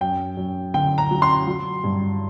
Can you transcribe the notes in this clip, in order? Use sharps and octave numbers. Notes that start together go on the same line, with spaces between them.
F#2 G5
F#2
D3 G5
A#5
F#3
C6
F#3
G2